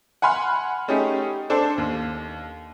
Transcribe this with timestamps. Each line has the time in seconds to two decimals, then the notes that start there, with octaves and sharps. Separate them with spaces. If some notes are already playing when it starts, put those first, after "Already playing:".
0.22 F#5 G#5 B5 C6 F6
0.88 A3 C#4 D#4 G4 G#4
1.50 D4 A4 C5
1.78 D#2